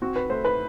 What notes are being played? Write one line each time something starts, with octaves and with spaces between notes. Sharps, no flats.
C4 F#4
B4
A3 C5
B4